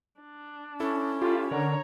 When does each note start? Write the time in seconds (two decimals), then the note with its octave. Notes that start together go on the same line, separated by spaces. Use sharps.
0.21 D4
0.80 C#4 E4 A4
1.22 E4 F4 G4 A4
1.51 D3 A#4 C#5 D5 F#5 A#5